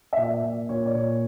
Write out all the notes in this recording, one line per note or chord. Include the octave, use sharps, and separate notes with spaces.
E5
A#2 D5
A#2
A#2 C#5
D5
A#2 C#5